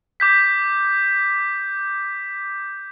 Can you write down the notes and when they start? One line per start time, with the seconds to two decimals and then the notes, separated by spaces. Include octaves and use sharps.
0.20 D6 G6 B6